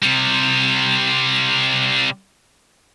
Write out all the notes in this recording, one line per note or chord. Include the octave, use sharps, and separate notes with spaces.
C3 G3